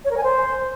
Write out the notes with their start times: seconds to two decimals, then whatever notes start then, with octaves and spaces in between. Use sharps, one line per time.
0.05 C#5
0.11 A#4
0.17 G#5
0.24 C5